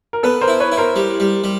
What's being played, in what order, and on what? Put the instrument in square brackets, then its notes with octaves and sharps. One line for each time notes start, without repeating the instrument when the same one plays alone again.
[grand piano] A#4
[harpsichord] B3 [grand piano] A4 B4
[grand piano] A#4 C5
[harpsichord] E4
[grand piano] B4 C#5
[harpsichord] E4
[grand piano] A#4 C5
[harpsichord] G3
G3
G3